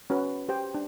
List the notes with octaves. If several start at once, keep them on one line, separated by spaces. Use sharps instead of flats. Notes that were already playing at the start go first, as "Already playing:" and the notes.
C#4 F#4 B4
G4 C5 G5
D4